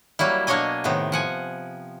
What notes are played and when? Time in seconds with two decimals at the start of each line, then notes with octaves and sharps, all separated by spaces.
0.19 F#3 G3 A#3 E4
0.47 B2 A#3 D4 C#5 D#5 G#5
0.84 A2 C3 D#3 B3
1.12 F3 F#5 G#5